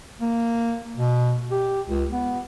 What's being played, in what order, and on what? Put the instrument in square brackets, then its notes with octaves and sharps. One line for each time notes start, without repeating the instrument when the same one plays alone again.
[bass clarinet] A#3
B2
G4
C#2
B3